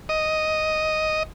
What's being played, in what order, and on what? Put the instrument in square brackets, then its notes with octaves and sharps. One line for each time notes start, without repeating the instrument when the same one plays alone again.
[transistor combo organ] D#5